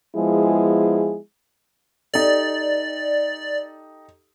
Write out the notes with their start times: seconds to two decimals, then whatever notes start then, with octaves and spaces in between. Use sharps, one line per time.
0.16 F3 G#3 B3 E4 G#4
2.14 D#4 G4 A4 D5